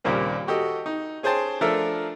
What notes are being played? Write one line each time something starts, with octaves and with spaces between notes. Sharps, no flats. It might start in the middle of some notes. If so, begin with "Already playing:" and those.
D#2 A#2 C#3 G3 A#3 C4
F#4 G4 A4 D#5
D#4
C#4 G#4 C5 G5 A5 C6
F3 A3 D4 A4 A#4 E5